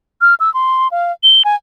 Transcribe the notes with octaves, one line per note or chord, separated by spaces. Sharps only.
F6
E6
C6
F5
G7
G#5